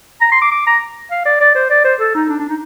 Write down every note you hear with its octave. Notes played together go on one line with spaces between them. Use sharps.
A#5
C6
D6
D6
A#5
F5
D5
D5
C5
D5
C5
A4
D#4
D4
D4
D#4